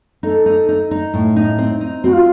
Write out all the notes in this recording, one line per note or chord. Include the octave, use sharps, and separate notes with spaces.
D#4 A4
D#4
D#4
D#4
A2
D#4
C4
D#4
C4 F#4
F4